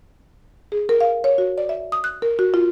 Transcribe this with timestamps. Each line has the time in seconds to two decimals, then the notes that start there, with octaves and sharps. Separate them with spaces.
0.72 G#4
0.89 A#4
1.01 F5
1.24 C#5
1.38 F#4
1.58 D5
1.69 E5
1.92 D#6
2.04 F#6
2.22 A#4
2.39 F#4
2.54 F4